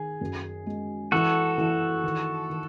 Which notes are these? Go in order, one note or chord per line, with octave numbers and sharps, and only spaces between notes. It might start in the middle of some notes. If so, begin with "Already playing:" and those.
Already playing: D#3 G#4
F#2
G#3
E3 F#4 A4
E3
D#3
D#3